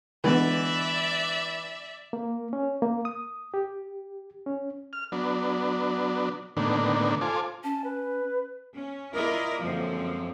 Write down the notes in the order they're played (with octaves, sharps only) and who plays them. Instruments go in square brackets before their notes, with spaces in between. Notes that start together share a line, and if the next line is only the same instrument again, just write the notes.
[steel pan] D3 G#3 B3 [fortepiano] E3 [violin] D5 E5
[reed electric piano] A#3
C#4
A#3
D#6
G4
C#4
[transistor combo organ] F6
F#3 B3 D4
A2 D3 D#3 A#3 B3 D4
F4 A4 C5 G#5 D6
[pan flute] C#4 [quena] A5
[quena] B4
[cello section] C#4
E4 F4 A#4 D5 D#5
F#2 D3 F3 G#3 A#3 C4